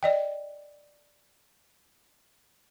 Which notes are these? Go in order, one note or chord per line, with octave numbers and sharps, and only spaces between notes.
D5 D#5 G5